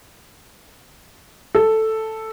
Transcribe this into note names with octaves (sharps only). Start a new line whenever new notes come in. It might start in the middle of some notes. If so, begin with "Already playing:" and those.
A4